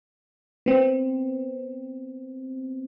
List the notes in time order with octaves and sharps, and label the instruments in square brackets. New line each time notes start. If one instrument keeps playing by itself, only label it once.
[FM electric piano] B3 C4